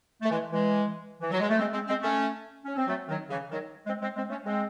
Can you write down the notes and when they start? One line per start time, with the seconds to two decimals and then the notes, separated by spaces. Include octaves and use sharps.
0.22 A3
0.31 E3 G#3
0.51 E3 G#3
1.20 E3
1.31 F#3
1.40 G#3
1.49 A3
1.58 G#3 C4
1.73 G#3 C4
1.87 G#3 C4
2.02 A3 C#4
2.65 C#4
2.76 C4
2.88 F#3 A3
3.08 D#3 F#3
3.30 C#3 E3
3.51 D#3 F#3
3.87 G#3 C4
4.01 G#3 C4
4.16 G#3 C4
4.30 A3 C#4
4.44 G#3 C4